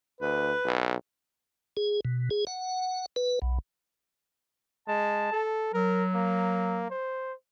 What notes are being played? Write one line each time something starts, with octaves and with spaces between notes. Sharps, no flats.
D2 B4
B1
G#4
B2
G#4
F#5
B4
B1
G#3 A5
A4
F#3 A#4
A#3
C5